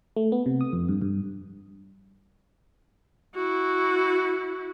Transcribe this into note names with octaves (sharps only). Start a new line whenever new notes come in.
A3
B3
C3
D#6
F2
G2
G2
E4 F#4